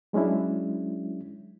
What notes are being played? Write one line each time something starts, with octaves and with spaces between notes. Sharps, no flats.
F#3 G#3 C#4 D4 E4